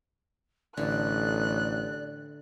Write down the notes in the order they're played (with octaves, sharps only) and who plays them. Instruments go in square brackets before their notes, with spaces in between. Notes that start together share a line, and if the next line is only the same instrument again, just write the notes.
[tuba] A1 [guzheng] D3 [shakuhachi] D5 [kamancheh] F#6